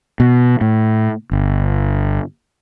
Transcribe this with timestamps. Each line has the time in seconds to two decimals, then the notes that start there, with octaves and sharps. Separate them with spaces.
0.20 B2
0.61 A2
1.31 G1